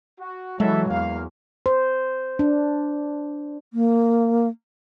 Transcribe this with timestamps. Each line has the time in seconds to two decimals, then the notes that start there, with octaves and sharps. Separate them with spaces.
0.20 F#4
0.60 E3 F#3 G#3 A4 E5
0.90 E2 A#3 F5
1.66 C5
2.39 D4
3.73 A#3